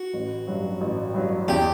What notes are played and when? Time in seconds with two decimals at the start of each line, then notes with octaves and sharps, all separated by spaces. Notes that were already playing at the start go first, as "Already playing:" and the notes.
Already playing: F#4
0.13 A1
0.47 G2 F#3
0.81 A1
1.14 G2 F#3
1.48 E2 G4